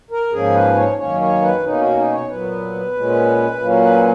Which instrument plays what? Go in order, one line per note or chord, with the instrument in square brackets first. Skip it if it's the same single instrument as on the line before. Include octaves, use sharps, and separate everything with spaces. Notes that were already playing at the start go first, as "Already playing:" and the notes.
[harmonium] A#4
G#2 F3 A#3 C#4 G#4
B4
C#5
F#2 D#3 A#3 C#4 C#5
C#5
B4
B2 A#3 C#4 D#4
F#4
D#4
C#5
A#2 F#3 B3 B4
A#2 G#3 C#4
A#2 F#3 A#3 C#4
B4